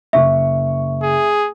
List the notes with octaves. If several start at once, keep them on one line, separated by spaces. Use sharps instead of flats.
F#1 E5 C#6
G#4